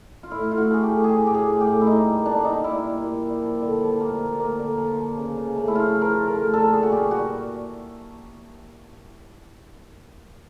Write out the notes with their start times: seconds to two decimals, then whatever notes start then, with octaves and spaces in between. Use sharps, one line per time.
0.23 F4
0.31 A2 E4
0.51 A2 F4
0.57 F#4
0.71 A3 G#4
0.83 G4
0.90 A2
1.04 F#3 G4 G#4
1.27 A2 G4
1.34 G#4
1.48 A3
1.61 G4
1.67 A2
1.81 E4
1.87 A#3 D#4
2.06 G3
2.25 A#2 D4
2.36 D4
2.44 G3 D#4
2.64 A#2 E4
2.84 A#2
3.03 A#2
3.23 G3
3.42 F3
3.62 D3
3.81 F3
4.00 A#3
4.20 A#3
4.40 A#3
4.59 D3
4.78 F3
4.97 F3
5.17 C#3
5.37 C#3
5.56 A3
5.68 E4
5.75 F3 F4
5.95 F3
6.02 A#4
6.14 F3
6.28 A#4
6.34 A3
6.53 A#2 A4
6.73 A#2 G#4
6.83 F#4
6.92 A#2 G4
7.11 G3 F#4